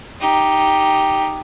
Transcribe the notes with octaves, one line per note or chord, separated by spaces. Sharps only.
D#4 G4